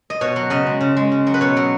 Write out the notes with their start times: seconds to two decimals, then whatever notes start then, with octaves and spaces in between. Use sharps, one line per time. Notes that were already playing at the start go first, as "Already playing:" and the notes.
0.10 D#5
0.21 B2 C#5
0.36 F#3
0.50 C#3 D#5
0.66 G#3
0.81 C#3
0.97 G#3
1.12 C#3
1.27 F#3
1.34 B4
1.41 B2 C#5
1.57 F#3